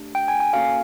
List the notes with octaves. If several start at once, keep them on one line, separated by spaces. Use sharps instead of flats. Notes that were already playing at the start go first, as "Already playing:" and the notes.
Already playing: A3 D4 G4
G5
G#5
G#5
A#3 C#4 F#4 A4 F5